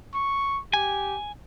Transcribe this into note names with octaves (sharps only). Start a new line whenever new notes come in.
C#6
G4 G#5